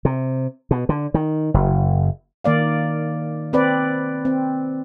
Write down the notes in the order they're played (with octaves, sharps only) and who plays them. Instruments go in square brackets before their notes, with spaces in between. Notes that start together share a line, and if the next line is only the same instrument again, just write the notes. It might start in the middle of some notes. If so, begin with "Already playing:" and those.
[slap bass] C3
B2
D3
D#3
F#1
[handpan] D#3 A#3 D5 F5
C4 B4 D5
C4